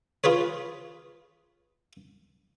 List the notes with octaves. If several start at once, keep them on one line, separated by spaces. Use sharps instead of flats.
F4 G#4 B4 C#5